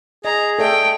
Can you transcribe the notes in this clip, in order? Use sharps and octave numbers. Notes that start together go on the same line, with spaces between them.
G#4 D#5 A#5
A3 A4 D5 E5 G5